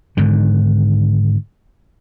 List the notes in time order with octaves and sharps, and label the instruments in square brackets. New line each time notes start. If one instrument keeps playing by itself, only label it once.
[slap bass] G#2 D3 D#3